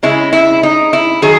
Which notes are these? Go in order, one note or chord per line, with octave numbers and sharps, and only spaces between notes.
C#3 G#3 C#4 E4
E4
D#4
E4
D#3 F#3 G#4